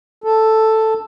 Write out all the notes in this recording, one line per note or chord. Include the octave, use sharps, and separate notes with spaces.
A4